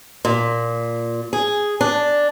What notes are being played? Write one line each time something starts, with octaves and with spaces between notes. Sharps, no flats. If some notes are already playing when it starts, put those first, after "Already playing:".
A#2
G#4
D4